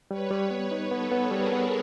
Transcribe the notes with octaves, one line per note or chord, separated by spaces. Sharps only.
G3 B4 C#5
G3
B3
D#4
B3 A4 B4
B3
G3 G#4 A#4
B3